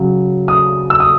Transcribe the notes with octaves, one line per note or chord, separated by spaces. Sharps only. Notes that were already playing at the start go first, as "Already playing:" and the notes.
Already playing: C#3 F#3
D#6
E6
D#6